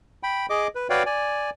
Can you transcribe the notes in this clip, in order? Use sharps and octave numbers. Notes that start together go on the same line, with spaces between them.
G5 B5
G#4 D#5 D6
B4
F#4 B4 C#5 D5 F5 G5
D5 G#5